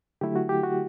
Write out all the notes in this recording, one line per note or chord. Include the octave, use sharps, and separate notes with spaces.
D3 F#3 A3 E4 G4
F#4
G4
F#4